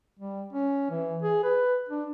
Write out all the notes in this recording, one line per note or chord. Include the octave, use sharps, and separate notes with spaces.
G3
C#4
E3
G#4
B4
D4